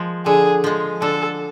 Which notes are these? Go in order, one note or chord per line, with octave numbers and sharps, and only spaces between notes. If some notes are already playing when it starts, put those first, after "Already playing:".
Already playing: F3 G#3
D3 G#4
F3 G#3
D3 A4